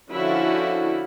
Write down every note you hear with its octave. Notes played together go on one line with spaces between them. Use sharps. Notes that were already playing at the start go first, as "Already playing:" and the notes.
D3 F3 C#4 E4 F#4 A4